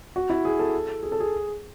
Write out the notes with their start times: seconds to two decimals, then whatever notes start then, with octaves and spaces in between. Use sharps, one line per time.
0.16 F#4
0.30 E4
0.45 G#4
0.59 A4
1.03 G#4
1.12 A4
1.20 G#4